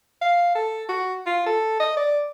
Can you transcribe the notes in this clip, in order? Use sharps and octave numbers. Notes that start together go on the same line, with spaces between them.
F5
A4
F#4
F4
A4
D#5
D5